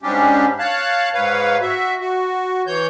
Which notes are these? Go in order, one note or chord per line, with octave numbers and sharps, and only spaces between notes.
G#2 G3 C#4 D4 G4
C#5 F5 A5 F#6
G#2 B4 C#5 F5
F#4 E5
F#4
E3 C#5 G6